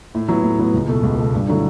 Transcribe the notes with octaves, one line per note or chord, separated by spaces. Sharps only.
A2
F#3 B3 E4
A2
F#3 B3 E4
C#2
B2 A3
C#2
B2 A3
G2
D3 F#3 A3 E4